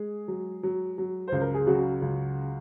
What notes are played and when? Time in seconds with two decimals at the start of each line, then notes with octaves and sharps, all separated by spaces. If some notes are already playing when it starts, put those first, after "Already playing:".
Already playing: G#3 G#4
0.28 F#3
0.63 F#3
0.98 F#3
1.28 C#2 C5
1.41 A#4
1.54 G#4
1.66 C#3 F#3 F#4
2.01 C#2